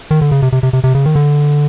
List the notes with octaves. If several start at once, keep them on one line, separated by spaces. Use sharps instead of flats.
D#3
D3
C#3
C3
C3
C3
C3
C3
C#3
D#3
D3